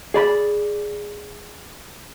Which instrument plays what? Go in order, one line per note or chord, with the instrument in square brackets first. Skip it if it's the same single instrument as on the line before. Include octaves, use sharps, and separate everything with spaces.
[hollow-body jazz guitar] G#4 D5 B5